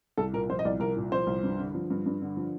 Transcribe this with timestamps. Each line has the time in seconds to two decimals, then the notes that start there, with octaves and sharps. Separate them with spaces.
0.17 C2 A4
0.33 A#2 A#4
0.49 F3 C5
0.59 D#5
0.65 C2 D5
0.80 C2 A#4
0.96 A#2
1.12 F3 C5
1.27 C2
1.43 G2
1.59 D3
1.75 F3
1.90 G2
2.06 G2
2.22 D3
2.37 F3